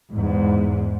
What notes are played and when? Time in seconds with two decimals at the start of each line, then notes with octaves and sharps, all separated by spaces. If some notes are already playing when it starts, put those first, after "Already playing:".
0.12 E2 G#2